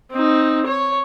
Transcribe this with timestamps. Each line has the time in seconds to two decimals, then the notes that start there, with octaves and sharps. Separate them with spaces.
0.12 C4 D#4
0.67 C#5